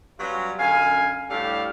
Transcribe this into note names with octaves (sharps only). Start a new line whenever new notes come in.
F#3 G3 B3 C#4 F4 F#4
F#2 D3 F5 G#5
A2 G3 D4 G4 A4 F5